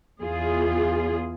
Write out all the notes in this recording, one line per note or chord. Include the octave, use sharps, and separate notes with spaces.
E2 F4 G#4